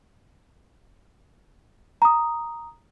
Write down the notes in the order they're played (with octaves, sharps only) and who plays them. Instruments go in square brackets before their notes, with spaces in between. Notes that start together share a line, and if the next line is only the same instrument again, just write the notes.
[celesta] A#5 D#6